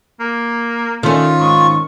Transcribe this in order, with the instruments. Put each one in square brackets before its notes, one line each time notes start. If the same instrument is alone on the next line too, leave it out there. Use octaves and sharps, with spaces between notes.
[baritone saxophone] A#3
[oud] D#3 C#4 [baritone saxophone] A3 [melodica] F4
[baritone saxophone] G#2 [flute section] C#6